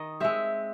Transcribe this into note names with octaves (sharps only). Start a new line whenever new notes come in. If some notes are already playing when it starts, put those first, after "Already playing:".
Already playing: D#3 D#5
G#3 C4 E5